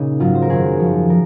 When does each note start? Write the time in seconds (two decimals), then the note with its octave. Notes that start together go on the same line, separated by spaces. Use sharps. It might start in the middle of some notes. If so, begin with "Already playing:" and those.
Already playing: A#2 C#3 D#4 G#4
0.20 G#2 F#3 F4
0.35 C5
0.42 A#4
0.50 F#2 D#3 F#3 G#4
0.80 F#2 F3
1.10 F3 A#4